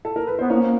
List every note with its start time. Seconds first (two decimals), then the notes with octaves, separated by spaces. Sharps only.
0.05 A4
0.16 A#4
0.27 B4
0.39 B3 C5
0.50 A#3 C#4 C#5